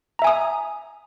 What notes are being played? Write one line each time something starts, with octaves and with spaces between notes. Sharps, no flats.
E5 G#5 A#5 D#6